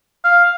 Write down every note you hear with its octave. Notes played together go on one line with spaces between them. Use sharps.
F5